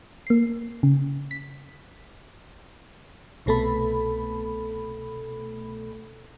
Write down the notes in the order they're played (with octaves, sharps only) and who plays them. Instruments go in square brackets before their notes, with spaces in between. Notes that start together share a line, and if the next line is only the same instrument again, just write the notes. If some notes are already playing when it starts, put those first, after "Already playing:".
[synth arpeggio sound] A#3 C7
C#3
B6
[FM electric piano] C2 B2 A3 A4 B5